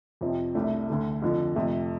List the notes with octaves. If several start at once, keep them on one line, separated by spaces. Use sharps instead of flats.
F2 C3 F3 C4
C2 C3 A3 D4
D2 D3 A3
F2 D3 F3
F2 C3 A3